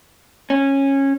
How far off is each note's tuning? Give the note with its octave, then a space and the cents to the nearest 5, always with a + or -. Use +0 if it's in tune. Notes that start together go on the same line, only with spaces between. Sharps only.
C#4 -15